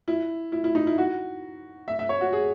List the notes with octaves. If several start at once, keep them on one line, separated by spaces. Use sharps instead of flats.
E4
E4
E4
D#4
E4
F#4
E5
E5
C#5
F#4
G#4